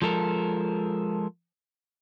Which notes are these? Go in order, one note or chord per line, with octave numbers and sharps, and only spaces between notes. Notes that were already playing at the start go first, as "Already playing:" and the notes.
F3 G#3 A4 A#4